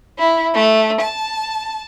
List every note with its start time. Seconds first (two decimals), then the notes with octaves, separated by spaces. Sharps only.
0.18 E4
0.53 A3
1.00 A5